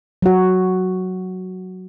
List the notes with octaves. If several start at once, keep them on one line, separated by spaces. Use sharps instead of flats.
F#3 F#4